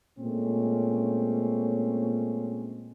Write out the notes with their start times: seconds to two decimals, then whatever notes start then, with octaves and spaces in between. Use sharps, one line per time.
0.19 A#2 G#3 A3 C4 C#4